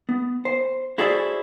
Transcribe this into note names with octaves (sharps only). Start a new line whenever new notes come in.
B3
C5
E4 F#4 G#4 A4 C5 D5